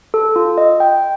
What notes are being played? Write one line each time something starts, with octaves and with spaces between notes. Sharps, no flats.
A4
F4
D#5
G5